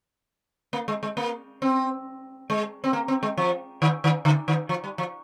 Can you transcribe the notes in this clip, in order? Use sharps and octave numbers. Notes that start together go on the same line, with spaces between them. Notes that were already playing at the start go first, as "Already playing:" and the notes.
A#3
G#3
G#3
A#3
C4
G#3
C4
A#3
C4
G#3
F3
D#3
D#3
D3
D#3
F3
G3
F3